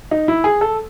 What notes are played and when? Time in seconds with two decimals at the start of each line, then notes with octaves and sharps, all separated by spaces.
0.11 D#4
0.28 E4
0.44 G#4
0.61 A4